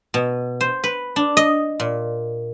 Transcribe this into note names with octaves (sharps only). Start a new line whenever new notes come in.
B2
C5
B4
D4
D#5
A#2